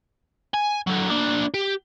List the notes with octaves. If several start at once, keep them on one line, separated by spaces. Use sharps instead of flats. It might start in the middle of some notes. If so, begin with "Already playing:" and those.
G#5
D3 F#3
A#3 D4
G4